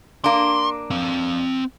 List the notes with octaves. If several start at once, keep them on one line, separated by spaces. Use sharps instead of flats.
A#3 D4 C6
C4 F5